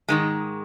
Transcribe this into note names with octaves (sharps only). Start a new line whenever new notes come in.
G#2 D#3 G#3